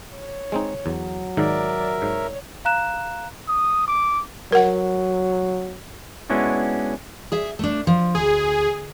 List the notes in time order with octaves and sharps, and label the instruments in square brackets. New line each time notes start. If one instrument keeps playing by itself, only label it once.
[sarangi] C#5
[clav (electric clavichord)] G#3 C4 D#4
[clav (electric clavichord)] E2 [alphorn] F#3
[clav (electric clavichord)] G#2 D#3 [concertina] A#4 E5 [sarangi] D5
[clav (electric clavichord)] G#2 [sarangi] C#5
[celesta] F5 A#5 F#6 E7
[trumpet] D#6
D6
[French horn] F#3 [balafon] A#4 F#5
[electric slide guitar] G#3 B3 C#4 D4 E4 F#4
[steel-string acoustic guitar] G#4 E5
A3 D4
F3
[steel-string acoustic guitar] D2 [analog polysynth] G#4